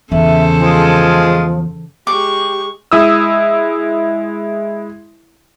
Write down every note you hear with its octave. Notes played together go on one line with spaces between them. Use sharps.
E2 C#3 A4 C5 E5
F3 G#3 F4 G#4
G#3 G4 C#6 D6
G#3 E4 D#6 E6